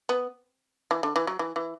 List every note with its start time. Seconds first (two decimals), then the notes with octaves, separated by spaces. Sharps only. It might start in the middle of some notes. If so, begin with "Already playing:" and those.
0.09 B3
0.91 E3
1.03 D3
1.16 E3
1.27 F#3
1.39 E3
1.56 E3